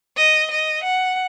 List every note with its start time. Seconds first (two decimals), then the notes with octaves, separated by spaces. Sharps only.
0.17 D#5
0.51 D#5
0.84 F#5